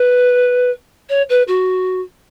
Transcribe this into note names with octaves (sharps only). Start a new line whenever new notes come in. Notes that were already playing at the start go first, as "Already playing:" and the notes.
Already playing: B4
C#5
B4
F#4